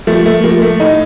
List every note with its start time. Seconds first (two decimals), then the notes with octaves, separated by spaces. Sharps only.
0.07 F3 A3
0.26 A3
0.44 F3 A#3
0.62 A3
0.80 A2 D#4